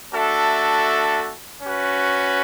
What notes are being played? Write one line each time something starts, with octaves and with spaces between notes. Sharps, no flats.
A3 D4 F#4 A4 E5
C#4 F#4 B4